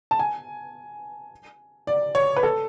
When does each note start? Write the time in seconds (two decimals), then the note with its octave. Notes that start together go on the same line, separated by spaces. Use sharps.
0.11 A5
0.19 G#5
1.87 D5
2.15 C#5
2.36 B4
2.43 A4